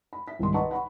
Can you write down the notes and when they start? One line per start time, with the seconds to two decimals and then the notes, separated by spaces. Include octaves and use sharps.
0.13 B5
0.27 E5 B6
0.39 C2 G#2 D#3 A#4 C6
0.54 B4 D#5 F#5 A5 A#5 C#6
0.71 F#5 B5 C#6